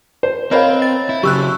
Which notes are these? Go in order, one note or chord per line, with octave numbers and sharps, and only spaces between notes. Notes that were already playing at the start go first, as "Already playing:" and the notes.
C5
C4 A#4 C5 C#5 D#5 F5 B5
A6
E4
C#3 F#3 G4 C#6 E6 F#6